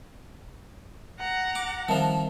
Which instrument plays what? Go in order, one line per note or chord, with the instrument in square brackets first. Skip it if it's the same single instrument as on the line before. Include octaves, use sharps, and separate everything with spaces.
[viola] F#5 A#5
[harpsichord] D6
[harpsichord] D#3 F3 [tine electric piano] G3 C4 E5 [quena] A5